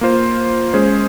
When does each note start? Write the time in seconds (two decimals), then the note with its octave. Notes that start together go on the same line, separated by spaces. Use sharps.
0.01 A#3 F4 C5
0.73 G#3 C#4 G#4 C5